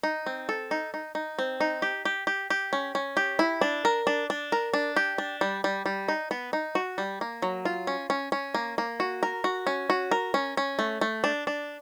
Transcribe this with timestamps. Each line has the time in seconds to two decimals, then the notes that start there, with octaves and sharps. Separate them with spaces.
0.03 D#4
0.26 C4
0.49 A4
0.71 D#4
0.94 D#4
1.15 D#4
1.39 C4
1.60 D#4
1.82 G4
2.05 G4
2.27 G4
2.50 G4
2.73 C#4
2.95 C#4
3.17 G4
3.39 E4
3.61 D4
3.85 A#4
4.07 D4
4.30 D4
4.52 A#4
4.74 D4
4.96 G4
5.18 D4
5.41 G3
5.64 G3
5.86 G3
6.08 D#4
6.31 B3
6.53 D#4
6.75 F#4
6.98 G3
7.21 A#3
7.42 F#3
7.65 F4
7.87 C#4
8.10 C#4
8.32 C#4
8.55 A#3
8.78 A#3
9.00 F#4
9.23 A#4
9.44 F#4
9.67 C#4
9.90 F#4
10.11 A#4
10.34 C#4
10.57 C#4
10.79 A3
11.01 A3
11.24 D4
11.47 D4